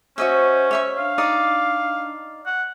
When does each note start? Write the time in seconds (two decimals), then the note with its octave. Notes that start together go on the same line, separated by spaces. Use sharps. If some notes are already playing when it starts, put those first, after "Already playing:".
0.18 C#4 F#4 C5 D#5 E5
0.71 C#5 E5 C#6
0.98 D4 F5
1.18 D#4 D5 D#6
2.46 F#5